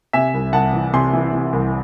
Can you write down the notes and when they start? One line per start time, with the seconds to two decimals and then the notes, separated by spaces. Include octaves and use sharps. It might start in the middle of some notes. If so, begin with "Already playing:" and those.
0.13 C3 E5 G#5
0.34 C2
0.53 C2 F#5 A5
0.73 E3
0.93 C3 G#5 C6
1.13 E3
1.33 C3
1.53 C2